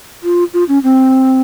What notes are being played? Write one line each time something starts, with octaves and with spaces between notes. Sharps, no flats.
F4
F4
C#4
C4